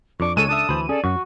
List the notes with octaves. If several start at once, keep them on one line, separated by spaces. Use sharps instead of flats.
F2 D4 C#6 D6
C#2 G#3 A4 C#5 E6 D#7
D4 A4 E5 A5 D#6
D2 E3 C5 B5
C#4 G#4 A4 D5
F#2 F#4 C#6